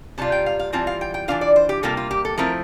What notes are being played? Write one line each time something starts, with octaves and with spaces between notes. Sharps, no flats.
C3 G3 F4 A5
G5
F5
F5
E3 G3 C4 F4 A5
F5
G5
G5
E3 A3 D4 F4 F5
D5
C5
G4
C3 G3 A#3 F4 A4
F4
G4
A4
F3 A3 C4 E4 A#4